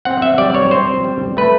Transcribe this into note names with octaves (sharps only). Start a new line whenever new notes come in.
C4 F#5
E5
G3 D5
C#5
C4 C5
G3
A3 B4